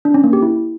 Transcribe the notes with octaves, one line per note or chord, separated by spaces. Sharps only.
D4
C#4
A#3
G4
E4